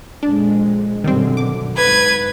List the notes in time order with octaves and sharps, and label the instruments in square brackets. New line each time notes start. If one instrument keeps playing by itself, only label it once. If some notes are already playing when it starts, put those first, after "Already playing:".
[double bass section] F2 A#2 G#3 [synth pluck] D4
[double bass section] F#2 B2 D3 [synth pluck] D#3 G3 C4
[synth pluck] D6
[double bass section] G#2 [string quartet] B4 G#6